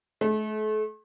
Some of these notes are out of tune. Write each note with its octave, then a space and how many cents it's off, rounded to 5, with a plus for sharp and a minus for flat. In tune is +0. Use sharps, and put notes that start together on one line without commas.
A3 -40